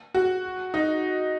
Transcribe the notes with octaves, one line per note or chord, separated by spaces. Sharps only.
F#4
D#4